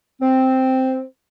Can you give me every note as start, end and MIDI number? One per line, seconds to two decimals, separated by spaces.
0.21 1.03 60